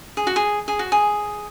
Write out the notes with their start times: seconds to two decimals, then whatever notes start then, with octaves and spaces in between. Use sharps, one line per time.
0.17 G#4
0.27 F#4
0.36 G#4
0.68 G#4
0.79 F#4
0.92 G#4